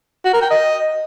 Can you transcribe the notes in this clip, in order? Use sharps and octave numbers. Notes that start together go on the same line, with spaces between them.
F#4
A#4
G5
D#5